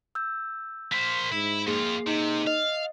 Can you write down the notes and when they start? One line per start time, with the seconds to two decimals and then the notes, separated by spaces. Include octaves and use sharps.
0.15 E6 G6
0.92 A#3 C5 B6
1.32 G#2 E4
1.67 F2 A#3 F4 G#4
2.07 C3 D#4
2.47 D#5 F5